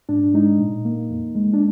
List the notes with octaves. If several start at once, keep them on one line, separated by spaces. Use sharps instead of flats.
G#2 D4
G#3 D#4
A#2
A#3
F2
G#3
D4